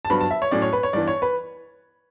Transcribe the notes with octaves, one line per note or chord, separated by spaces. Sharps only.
A5
G2 F#3 B3 D4 B5
A5
E5
C#5
A2 F#3 C#4 D5
C#5
B4
C#5
G2 E3 B3 D5
C#5
B4